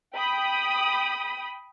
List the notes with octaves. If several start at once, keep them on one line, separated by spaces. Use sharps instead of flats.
G5 B5 D#6